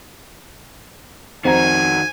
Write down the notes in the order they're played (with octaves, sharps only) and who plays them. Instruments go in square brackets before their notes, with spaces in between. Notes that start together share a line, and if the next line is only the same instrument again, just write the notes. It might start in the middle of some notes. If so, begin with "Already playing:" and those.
[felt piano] F2 A#5 [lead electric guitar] D#3 F#4 [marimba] C5 [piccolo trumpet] G#5